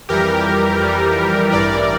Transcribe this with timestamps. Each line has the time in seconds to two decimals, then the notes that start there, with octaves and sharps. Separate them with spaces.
0.09 F2 E3 G3 G4 A#4
0.81 F2 E3 G3
1.52 A1 G2 E3 G3 A#4 D5